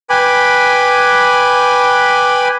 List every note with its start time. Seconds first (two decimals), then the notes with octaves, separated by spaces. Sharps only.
0.10 B4 G5 G#5 B5 D6